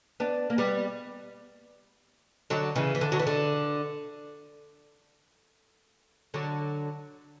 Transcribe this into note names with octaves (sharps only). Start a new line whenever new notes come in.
B3 D4
A#3
G3 B3
D3 F#3
C#3 E3
E3
D3
F#3
E3
D3
D3 F#3